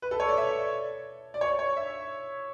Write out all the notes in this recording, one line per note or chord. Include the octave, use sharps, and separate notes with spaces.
B4
A4
C#5
D5
E5
D5
C#5
C#5
E5